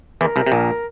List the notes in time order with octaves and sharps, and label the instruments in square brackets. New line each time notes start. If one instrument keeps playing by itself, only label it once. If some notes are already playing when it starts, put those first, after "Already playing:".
[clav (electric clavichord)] E2 E3 [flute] A#4
[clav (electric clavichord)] C2 C3
C3
A#1 A#2